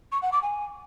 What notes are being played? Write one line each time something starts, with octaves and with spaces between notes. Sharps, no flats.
C#6
F#5
D6
G#5